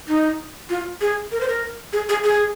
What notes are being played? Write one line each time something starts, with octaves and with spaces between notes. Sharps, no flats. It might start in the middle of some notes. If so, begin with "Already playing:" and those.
D#4
F4
G#4
A#4
C5
A#4
G#4
G#4
G#4